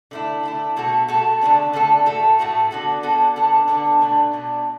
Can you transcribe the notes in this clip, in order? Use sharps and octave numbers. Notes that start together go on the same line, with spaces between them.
D3 A3 E4
D3 A3 E4
B2 A3 F#4 A4
B2 A3 F#4 A4
D3 A3 D4 A4
D3 A3 D4 A4
A2 A3 F#4 A4
A2 A3 F#4 A4
D3 B3 F#4 A4
D3 B3 F#4 A4
D3 B3 D4 A4
D3 B3 D4 A4
B2 A3 D4
B2 A3 D4